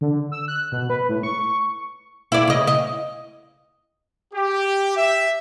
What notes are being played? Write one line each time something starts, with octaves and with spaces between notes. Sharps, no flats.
D3
E6
F#6
B2
B4
A2
C#6
E4 D5
C#3 D#5
D#5
G4
E5